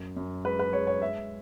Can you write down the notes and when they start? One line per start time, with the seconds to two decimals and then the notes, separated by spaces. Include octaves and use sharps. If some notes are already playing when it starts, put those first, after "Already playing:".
Already playing: F#2
0.16 F#2
0.45 G#3 B4
0.59 B4
0.73 G#3 C#5
0.87 C#5
1.02 G#3 E5